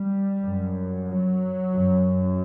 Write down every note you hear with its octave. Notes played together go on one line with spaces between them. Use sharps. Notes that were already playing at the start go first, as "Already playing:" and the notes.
Already playing: G3
F#2
F#3
F#2